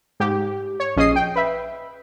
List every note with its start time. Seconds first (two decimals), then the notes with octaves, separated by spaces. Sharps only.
0.20 G#2 G4
0.80 C#5
0.96 A#1 C#4 G#4 D#5 D#6 C7
1.16 G5
1.36 B4 E5